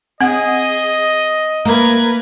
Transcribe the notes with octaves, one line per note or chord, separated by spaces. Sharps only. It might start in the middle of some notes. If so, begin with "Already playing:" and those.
C4 G#4 D#5 F#5
A#3 A#4 B4 G#6